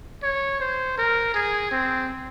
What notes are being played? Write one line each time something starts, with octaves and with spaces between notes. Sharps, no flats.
C#5
C5
A#4
G#4
C4